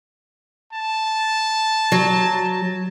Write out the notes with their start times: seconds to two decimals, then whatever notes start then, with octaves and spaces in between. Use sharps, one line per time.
0.73 A5
1.92 F#3